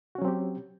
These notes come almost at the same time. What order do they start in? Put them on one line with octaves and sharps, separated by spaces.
F#4 C#4 F#3 C4 G4